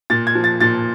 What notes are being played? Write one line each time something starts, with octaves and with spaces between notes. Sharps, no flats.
A#2 A6
G#6
F3
A6
A#2 A6